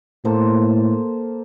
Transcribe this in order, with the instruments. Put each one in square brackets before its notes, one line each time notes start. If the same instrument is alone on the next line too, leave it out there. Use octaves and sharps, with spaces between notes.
[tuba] A2 [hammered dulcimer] A#3 A4 C5